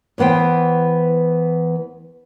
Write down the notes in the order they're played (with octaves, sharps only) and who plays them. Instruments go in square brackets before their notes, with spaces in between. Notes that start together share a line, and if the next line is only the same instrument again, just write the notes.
[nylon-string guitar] E2 E3 B3 C5 G5